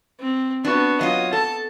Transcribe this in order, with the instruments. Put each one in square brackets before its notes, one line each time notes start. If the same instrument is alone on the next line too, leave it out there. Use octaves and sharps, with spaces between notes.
[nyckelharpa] C4
[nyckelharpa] B3 F#4 [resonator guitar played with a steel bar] D4
[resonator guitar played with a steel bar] F#3 F4 [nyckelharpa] D#5
[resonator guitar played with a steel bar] A4 [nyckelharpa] A5